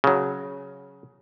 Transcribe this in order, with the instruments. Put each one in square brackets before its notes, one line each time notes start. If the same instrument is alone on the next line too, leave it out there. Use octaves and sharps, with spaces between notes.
[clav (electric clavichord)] C#3 F#3